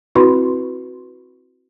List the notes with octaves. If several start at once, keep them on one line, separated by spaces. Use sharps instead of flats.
C4 E4 F#4 B4 B5 C6